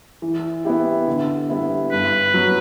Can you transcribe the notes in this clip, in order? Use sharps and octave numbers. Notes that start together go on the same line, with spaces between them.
E3
B3 E4 G4
D3
G3 B3 E4
G2 B4
F#3 B3